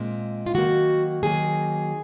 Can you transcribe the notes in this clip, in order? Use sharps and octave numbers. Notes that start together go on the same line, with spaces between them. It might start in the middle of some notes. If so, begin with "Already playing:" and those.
Already playing: A#2 G#3 C4
F4
D#3 F#3 A#3 F#4
D#3 F#3 A#3 G#4